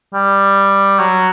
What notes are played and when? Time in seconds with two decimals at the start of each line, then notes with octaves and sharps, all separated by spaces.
0.14 G3
0.99 F#3